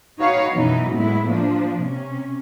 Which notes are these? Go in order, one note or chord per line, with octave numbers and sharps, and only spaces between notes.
D#4 F#4 B4 C#5 F5
F#2 B2 E3 F#3 B3 D#4
A2 G#3 A3 B3 E4
F3 A#3 D4
C3 C#4